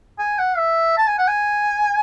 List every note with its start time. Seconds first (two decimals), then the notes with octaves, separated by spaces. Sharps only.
0.18 G#5
0.39 F#5
0.57 E5
0.98 A5
1.07 G#5
1.18 F#5
1.28 G#5